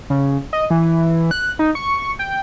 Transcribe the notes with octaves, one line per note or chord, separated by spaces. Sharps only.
C#3
D#5
E3
F#6
D#4
C#6
G5